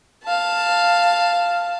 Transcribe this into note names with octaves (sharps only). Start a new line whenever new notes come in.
F5 A5